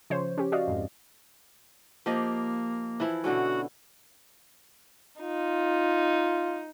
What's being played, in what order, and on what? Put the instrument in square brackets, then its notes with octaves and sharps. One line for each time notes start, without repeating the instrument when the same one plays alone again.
[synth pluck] C#3 F3 C5 C#5
C#4 G4
F#4 D5 D#5 F5
F2 G#2
[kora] F3 G4 D#5 [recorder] A#3
[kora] E3 F3 E4
[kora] B2 D3 C#4 [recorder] F#4
[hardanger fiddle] D#4 [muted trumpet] F4